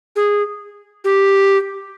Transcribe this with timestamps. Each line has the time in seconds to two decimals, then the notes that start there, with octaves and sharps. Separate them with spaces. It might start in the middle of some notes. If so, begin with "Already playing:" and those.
0.16 G#4
1.04 G4